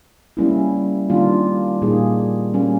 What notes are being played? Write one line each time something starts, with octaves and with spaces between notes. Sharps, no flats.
G3 A#3 C#4 E4
D#3 G3 A#3 D4 F4
A#2 G3 A#3 D#4 G#4
G3 A#3 C#4